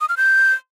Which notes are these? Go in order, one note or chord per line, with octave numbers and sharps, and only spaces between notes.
D#6
F6
G6